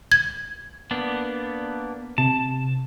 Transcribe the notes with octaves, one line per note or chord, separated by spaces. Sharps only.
G#6
A#3 B3 D4
C3 A5